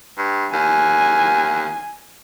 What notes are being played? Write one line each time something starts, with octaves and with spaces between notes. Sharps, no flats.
G2
D#2 G#5